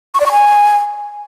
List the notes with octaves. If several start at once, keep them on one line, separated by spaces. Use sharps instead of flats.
C#6
D5
C#6
G#5